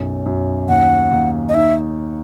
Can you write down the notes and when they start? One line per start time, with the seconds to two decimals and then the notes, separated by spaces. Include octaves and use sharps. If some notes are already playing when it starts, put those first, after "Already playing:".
Already playing: B1 F#2
0.26 F#2
0.68 D#2 F#5
1.11 D#2
1.49 D#5
1.54 D#4 E5